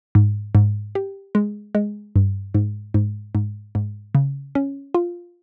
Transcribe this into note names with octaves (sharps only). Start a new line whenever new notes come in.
G#2
G#2
G4
G#3
G#3
G2
G#2
G#2
G#2
G#2
C#3
C#4
F4